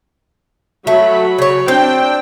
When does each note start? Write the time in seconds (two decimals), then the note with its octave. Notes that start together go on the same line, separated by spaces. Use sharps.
0.87 F#3 A3 B5
1.39 C#3 C#5
1.68 C4 D4 G5